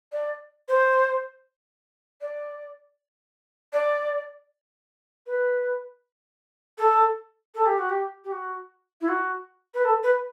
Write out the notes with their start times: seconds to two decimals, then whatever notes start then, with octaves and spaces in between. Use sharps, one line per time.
0.12 D5
0.68 C5
2.21 D5
3.73 D5
5.27 B4
6.78 A4
7.55 A4
7.66 G4
7.79 F#4
7.90 G4
8.24 G4
8.32 F#4
9.01 E4
9.08 F#4
9.74 B4
9.85 A4
10.03 B4